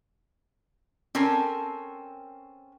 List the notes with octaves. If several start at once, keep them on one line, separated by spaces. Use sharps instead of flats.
C4 C#4 A4 A#4